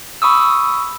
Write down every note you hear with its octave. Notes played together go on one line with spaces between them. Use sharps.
B5 C#6 D#6 E6